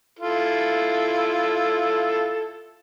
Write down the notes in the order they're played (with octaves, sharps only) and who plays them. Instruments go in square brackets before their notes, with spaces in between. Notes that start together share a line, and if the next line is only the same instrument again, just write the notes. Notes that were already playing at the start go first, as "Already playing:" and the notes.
[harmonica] E4 F4 A4